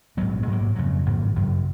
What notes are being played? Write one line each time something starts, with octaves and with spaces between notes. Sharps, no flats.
A#1 G#2 F#3 B3
G#2 F#3 A#3
F2 C#3 F#3
G#1 G#2 F3 A#3
G#1 F#2 C#3 F#3